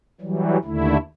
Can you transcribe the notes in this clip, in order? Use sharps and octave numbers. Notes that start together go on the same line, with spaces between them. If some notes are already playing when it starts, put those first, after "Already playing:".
E3 F#3 G3
D#2 D3 A3 E4